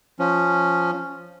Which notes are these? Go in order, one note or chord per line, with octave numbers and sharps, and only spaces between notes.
F3 C#4